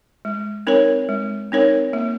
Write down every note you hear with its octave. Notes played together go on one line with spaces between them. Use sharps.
G#3
C4 D#4 A#4 C#5
G#3
C4 D#4 A#4 C#5
A#3